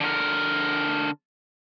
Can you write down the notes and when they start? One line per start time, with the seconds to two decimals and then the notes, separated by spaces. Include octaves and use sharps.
0.01 D3 A#4